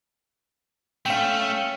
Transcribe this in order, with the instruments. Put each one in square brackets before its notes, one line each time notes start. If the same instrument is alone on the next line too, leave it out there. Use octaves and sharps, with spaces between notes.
[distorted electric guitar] A3 [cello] C#4 [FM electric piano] F5 G5